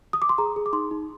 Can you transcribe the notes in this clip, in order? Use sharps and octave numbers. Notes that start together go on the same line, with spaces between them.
D#6
D6
C6
G#4 A#5
G#4
D6
D#4 C6
D#4